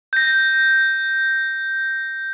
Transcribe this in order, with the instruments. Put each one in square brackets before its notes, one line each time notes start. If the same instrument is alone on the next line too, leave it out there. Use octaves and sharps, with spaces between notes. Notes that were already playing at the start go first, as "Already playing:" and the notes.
[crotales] G6 A#6